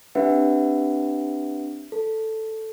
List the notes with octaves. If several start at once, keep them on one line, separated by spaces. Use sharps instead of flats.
C4 D4 G4 B4 E5 F#5
A4